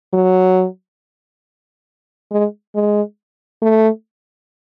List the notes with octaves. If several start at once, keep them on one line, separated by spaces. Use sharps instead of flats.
F#3
G#3
G#3
A3